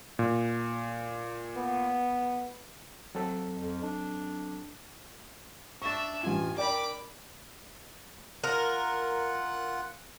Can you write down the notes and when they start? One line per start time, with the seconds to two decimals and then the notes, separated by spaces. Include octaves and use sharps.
0.19 A#2
1.56 B3
3.15 F#3 C4 A4
3.56 F2
3.83 D4
5.82 D4 E5 C#6 A6
6.23 A1 C#4 F4 G#5
6.57 A#4 D5 G5 B5 D6
8.44 F4 A#4 F#5 F#6